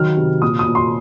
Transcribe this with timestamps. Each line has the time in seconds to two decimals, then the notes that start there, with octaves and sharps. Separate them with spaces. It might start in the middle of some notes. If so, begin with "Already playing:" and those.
Already playing: D#3 F#3 F6
0.17 C3
0.42 A#2 D#6
0.59 D#6
0.68 A#2
0.75 C6